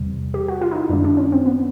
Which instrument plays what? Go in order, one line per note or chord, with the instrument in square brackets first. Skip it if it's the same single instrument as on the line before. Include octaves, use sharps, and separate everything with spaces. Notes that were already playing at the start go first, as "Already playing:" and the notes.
Already playing: [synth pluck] E2 C3 E3 G3
G4
F#4
F4
D#4
E4
F#2 D#3 G#3 D4
D4
C#4
C4
B3